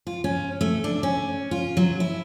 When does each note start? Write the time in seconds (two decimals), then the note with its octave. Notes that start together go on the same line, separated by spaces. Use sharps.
0.07 F4
0.24 C#4
0.61 A3
0.84 D4
1.03 C#4
1.51 F4
1.77 F#3
2.00 E4